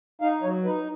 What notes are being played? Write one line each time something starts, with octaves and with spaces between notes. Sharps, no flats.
D#4 F5
F#3 C#5
D#4 B4